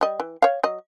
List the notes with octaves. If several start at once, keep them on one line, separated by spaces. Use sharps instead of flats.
G3 D#5
E3
C#5 F5
F#3 D#5